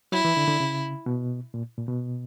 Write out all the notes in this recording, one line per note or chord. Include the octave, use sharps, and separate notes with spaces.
F#3 E4
E3
D3
D3
C#3
B2
A#2
A#2
B2